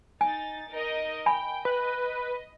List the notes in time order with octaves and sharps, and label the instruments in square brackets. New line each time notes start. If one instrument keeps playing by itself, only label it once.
[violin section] D#4 A6 [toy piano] G#5
[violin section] D#4 A#4 D#5
[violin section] G5 [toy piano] G#5 B5
[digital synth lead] B4 [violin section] D#5